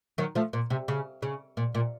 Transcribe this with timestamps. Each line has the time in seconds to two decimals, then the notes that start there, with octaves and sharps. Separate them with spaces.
0.18 D#3 F#3
0.35 F3 A3
0.53 A#2
0.70 C3
0.88 C#3
1.22 C#3
1.57 A#2
1.75 A#2